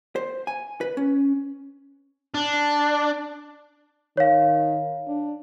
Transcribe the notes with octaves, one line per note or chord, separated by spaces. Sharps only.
C5
G#5
B4
C#4
D4
D#3 C#5 F5
D4